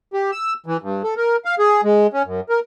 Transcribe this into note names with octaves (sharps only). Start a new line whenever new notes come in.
G4
E6
E3
G2
A4
A#4
F5
G#4
G#3
C#4
F#2
A#4